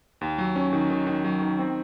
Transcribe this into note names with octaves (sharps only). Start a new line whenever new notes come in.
D#2
F#3
C#4
D#3
D#3
D#3
F#3
D#3
C4